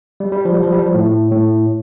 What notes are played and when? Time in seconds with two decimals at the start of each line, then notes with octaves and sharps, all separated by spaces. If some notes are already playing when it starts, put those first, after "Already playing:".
0.20 G3
0.32 G3
0.45 F3
0.54 G3
0.63 F3
0.72 G3
0.83 F3
0.94 A2
1.32 A2